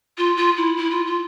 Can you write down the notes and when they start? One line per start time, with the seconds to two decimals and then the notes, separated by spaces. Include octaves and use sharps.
0.18 F4
0.37 F4
0.57 E4
0.77 E4
0.91 F4
1.06 F4